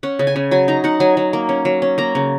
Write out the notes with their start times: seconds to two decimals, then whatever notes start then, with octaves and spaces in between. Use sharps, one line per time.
0.03 C#4 F#5
0.19 C#3
0.27 G#5
0.36 C#3
0.51 F#3 G#5
0.68 D#4 A#5
0.84 D#4 F#5
1.00 F#3 G#5
1.17 F#3
1.33 A#3
1.49 C#4
1.65 F#3
1.82 C#4
1.98 A#3 A#5
2.15 C#3